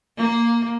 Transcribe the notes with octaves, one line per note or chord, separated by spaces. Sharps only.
A#3